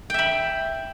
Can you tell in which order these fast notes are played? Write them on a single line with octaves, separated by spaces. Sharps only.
G5 E5 B5